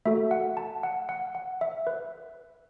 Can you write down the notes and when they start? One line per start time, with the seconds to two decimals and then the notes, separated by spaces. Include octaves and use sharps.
0.06 A3 F#4 A4 E5
0.31 F#5
0.57 A5
0.83 F#5
1.09 F#5
1.35 F#5
1.61 E5
1.87 B4